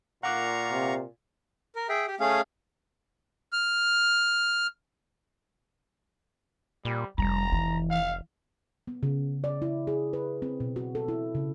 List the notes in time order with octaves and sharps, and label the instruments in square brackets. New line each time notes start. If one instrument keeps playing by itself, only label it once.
[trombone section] A#2 [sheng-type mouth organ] F5 A#5 C#6 [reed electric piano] F#5 D6 F#6
[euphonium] C3
[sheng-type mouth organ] A#4
G#4 E5 G5
G4
A3 C#4 G#4 F5
F6
[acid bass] A#2 [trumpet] G3
[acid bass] F1 [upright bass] G3 [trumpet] A#5
[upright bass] E3
[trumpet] F5
[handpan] B3
C#3
D5
E4
G#4
B4
C4
B2
F#4
A4
E4
C#3